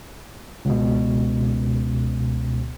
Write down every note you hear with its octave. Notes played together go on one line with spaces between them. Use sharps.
C#2 B2